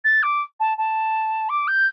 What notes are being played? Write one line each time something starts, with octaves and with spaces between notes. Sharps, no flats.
A6
D6
A5
A5
D6
G6